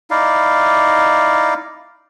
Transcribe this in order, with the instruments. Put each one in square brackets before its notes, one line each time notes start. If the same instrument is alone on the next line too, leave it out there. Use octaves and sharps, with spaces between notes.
[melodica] D#4 E4 D5 F5